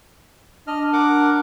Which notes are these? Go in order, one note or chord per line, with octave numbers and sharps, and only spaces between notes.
D4 D#5 F6
A#4 F#5 D6